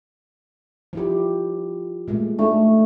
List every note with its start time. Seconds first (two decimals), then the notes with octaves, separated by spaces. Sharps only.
0.93 F3 E4 G4
2.08 A#2 G#3 A3
2.39 A3 D4 D#4